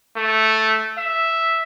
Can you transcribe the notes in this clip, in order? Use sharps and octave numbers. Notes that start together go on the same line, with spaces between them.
A3
E5